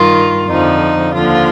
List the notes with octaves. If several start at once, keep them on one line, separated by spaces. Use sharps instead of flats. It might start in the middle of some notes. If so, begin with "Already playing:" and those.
Already playing: G2 D#3 F4
F2 D3 F3 D#4
D#2 D3 F3 F4